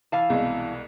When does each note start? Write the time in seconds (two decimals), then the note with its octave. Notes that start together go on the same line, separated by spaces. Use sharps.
0.12 E3 F5 A5
0.30 C2 B2 G#3